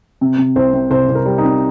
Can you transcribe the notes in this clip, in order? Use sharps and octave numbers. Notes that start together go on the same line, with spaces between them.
C3
C3
C2 C5
C3
C2 C5
C2
A#4
G3
D#4
C3